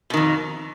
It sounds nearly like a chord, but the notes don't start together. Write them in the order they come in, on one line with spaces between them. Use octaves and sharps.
B2 D#3 F2